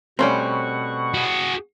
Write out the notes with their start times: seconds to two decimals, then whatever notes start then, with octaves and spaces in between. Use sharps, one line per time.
0.19 B2 G3 A3 C4 C#4 C5 F#5 C#6
1.14 F#4 G#4